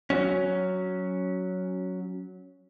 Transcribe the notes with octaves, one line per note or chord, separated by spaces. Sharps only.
F#3 C#4